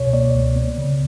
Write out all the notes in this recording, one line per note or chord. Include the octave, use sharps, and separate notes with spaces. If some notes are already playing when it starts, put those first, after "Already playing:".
Already playing: C#2 B2 C#5
A#3 D5
C#2
B3
C#3